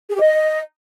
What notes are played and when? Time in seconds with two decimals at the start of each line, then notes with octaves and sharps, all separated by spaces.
0.09 G#4
0.15 G4
0.20 D#5